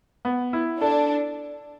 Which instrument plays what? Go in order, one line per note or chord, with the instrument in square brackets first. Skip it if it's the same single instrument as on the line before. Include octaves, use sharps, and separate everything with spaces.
[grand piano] B3
E4
[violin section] D4 [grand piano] A4